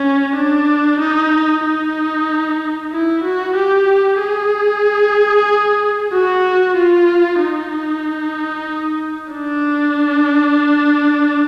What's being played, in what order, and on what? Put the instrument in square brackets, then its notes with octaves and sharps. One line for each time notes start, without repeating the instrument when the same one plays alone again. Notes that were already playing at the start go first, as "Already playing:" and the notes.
Already playing: [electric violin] C#4
D4
D#4
D#4
E4
F#4
G4
G#4
F#4
F4
D#4
D4